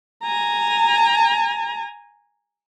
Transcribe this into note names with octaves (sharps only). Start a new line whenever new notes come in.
G#5 A#5